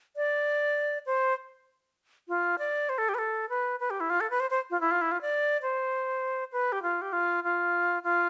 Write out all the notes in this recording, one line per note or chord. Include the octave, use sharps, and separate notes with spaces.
D5
C5
F4
D5
C5
A4
G4
B4
A4
B4
B4
G4
E4
F4
A4
B4
C5
C5
F4
E4
F4
E4
F4
D5
C5
B4
G4
F4
G4
F4
F4
F4